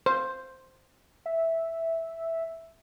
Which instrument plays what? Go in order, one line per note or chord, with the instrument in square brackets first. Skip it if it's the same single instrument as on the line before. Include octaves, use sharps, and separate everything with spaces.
[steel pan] C5
[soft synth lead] E5